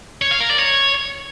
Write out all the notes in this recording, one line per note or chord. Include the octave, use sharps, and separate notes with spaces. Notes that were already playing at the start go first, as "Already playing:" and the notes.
C#5
F5
A#4
D5
C#5